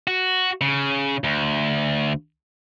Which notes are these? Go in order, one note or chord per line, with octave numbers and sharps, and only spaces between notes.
F#4
C#3
D2